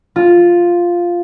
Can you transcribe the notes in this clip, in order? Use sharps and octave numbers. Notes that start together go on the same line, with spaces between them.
F4